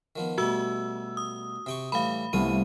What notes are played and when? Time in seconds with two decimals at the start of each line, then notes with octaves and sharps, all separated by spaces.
0.16 D#3 F3 B3
0.38 B2 G3 A3 F#4 E6
1.17 D#6
1.66 C3 G5 C#6
1.92 A2 E3 G3 F5 B5
2.33 C2 A3 B3 F4 D#7